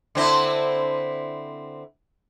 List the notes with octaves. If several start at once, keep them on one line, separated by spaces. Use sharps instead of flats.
D3 C4 E4